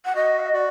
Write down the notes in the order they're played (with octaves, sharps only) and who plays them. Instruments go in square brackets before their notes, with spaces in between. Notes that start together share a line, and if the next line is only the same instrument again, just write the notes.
[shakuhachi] F#5
[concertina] F#4 [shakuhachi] D#5
[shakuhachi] F#5
D#5
[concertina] F#4 [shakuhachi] D5